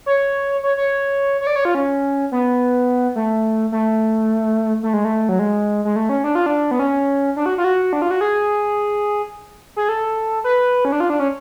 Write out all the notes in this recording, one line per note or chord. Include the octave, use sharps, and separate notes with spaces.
C#5
C#5
C#5
C#5
D5
C#5
F4
C#4
B3
A3
A3
A3
G#3
A3
F#3
G#3
G#3
A3
C#4
D4
F4
D4
B3
C#4
D4
F#4
F4
F#4
D4
F4
F#4
G#4
G#4
A4
B4
C#4
D4
F4
D4
C#4